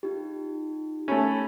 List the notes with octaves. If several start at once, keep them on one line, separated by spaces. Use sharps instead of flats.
D#4 F4 G4
A3 C#4 G4 B5 B6